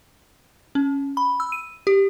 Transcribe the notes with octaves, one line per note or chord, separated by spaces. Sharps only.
C#4
B5
E6
D#7
G4